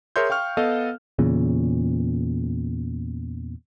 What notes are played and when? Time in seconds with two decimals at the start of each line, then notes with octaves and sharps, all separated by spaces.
0.16 G#4 A#4 C#5 E5 C6 G6
0.30 F5 G5 C#6 F6
0.57 B3 A4 D#5 F5
1.19 E2 A#2 C#3